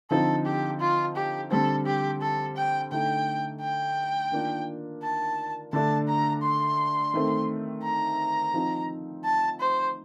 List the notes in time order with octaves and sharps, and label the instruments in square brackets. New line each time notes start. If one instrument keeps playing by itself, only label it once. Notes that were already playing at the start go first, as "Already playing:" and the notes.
[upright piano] D3 F3 C4 D#4 [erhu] A4
[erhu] G4
F4
G4
[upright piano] D3 G3 C4 [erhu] A4
[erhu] G4
A4
G5
[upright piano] D3 A3 D#4 [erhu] G5
[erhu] G5
[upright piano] D#3 A#3 D4 F4
[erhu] A5
[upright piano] D3 A3 D4 [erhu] A5
[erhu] A#5
C6
[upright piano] D#3 A3 C4
[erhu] A#5
[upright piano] F3 C4 D#4
[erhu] A5
C5